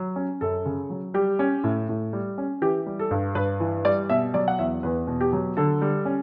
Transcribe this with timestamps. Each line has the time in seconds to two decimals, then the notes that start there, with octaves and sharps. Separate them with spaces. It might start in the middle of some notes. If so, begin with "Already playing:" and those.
Already playing: F#3
0.16 C#4
0.41 F#2 A4
0.66 C#3
0.90 F#3
1.14 G3 G4
1.39 C#4
1.64 A2
1.89 A2
2.13 G3
2.38 C#4
2.62 E3 G4
2.86 G3
2.99 A4
3.11 G2
3.35 G2 B4
3.60 E3
3.85 G3 D5
4.10 B2 E5
4.34 F#3 D5
4.48 F#5
4.59 E2 E5
4.83 E2 B4
5.07 B2
5.21 G4
5.33 F#3
5.57 D3 A4
5.82 G3
6.06 C#4